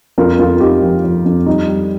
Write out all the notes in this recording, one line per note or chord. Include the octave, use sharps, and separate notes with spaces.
F2 F4 A#4
F2 F4 A#4
F2 D#4 G4
F3
F3
F2
G3 D#4
G3